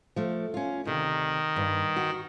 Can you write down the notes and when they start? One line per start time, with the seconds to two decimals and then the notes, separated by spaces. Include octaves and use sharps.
0.16 F3 A3
0.54 C#4 F4
0.85 D2 C3 D#3
1.56 G2
1.96 F#4